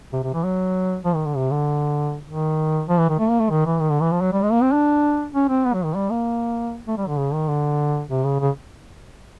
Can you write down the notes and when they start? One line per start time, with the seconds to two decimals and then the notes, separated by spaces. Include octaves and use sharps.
0.13 C3
0.23 C3
0.34 E3
0.44 F#3
1.05 F3
1.15 D#3
1.26 D3
1.36 C3
1.51 D3
2.28 D#3
2.88 F3
2.98 E3
3.09 D#3
3.19 A3
3.29 A#3
3.39 A3
3.50 D#3
3.66 E3
3.80 D#3
3.90 D3
4.01 E3
4.12 F3
4.21 F#3
4.32 G3
4.42 G#3
4.52 A#3
4.62 C4
4.73 D4
5.34 C#4
5.49 C4
5.65 B3
5.74 F#3
5.84 D#3
5.95 G3
6.10 A#3
6.87 A3
6.97 G3
7.07 D3
7.18 C#3
7.33 D#3
7.48 D3
8.10 C3
8.24 C#3
8.40 C#3